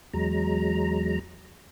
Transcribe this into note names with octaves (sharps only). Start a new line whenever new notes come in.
E2 F#3 G#3 A#5